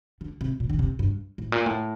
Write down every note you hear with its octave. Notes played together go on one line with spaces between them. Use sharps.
D3
C3
A#2
D3
C3
G2
A2
A#2
A2